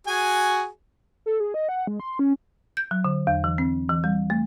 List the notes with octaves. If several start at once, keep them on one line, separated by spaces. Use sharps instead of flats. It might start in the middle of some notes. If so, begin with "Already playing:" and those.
F#4 G#4 G#5
A4
G#4
D#5
F#5
G#3
C6
C#4
G6
F#3
D3
E2
E3
C4
E3
G3
A3